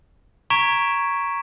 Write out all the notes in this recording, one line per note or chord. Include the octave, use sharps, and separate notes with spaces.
A#5 C#6 G#6 B6 D7 E7